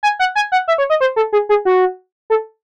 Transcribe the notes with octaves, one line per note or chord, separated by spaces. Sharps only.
G#5
F#5
G#5
F#5
E5
C#5
D#5
C5
A4
G#4
G#4
F#4
A4